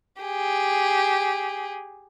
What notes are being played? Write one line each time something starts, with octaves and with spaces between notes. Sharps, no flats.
G4 G#4